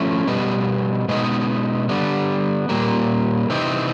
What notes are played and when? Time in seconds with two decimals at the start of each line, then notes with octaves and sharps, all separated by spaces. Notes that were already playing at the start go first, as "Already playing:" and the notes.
Already playing: F3 A3 C#4 E4
0.27 B2 G3 B3
1.08 B2 G#3 B3 D#4
1.89 D3 G3 B3
2.69 A#2 G3 A#3
3.49 C3 E3 C4 D#4